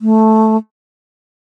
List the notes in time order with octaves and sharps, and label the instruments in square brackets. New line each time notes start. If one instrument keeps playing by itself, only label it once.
[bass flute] A3